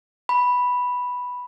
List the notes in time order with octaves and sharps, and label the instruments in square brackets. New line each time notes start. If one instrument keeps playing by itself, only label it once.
[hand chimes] B5